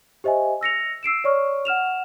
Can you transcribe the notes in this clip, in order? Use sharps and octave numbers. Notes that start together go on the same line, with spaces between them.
G4 C5 D#5 E5 G#5
E6 A#6 C#7 F7
E6 C7 D7 E7
C#5 D5 C#6 F6
F#5 F6 E7 F7